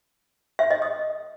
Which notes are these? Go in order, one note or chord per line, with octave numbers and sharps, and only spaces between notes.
E5
D#5
D#6